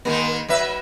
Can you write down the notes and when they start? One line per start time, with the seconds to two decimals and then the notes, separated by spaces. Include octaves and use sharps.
0.05 D#3 G#3 A#3
0.49 F#3 B4 E5